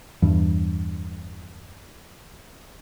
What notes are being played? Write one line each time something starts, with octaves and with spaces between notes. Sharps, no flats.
E2 G2